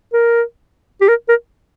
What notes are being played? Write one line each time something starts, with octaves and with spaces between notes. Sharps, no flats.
A#4
G4
A#4
A#4